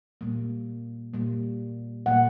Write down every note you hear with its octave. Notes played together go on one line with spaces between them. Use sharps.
A#2 G3 A#3
A#2 G3 A#3
A#2 G3 A#3 F#5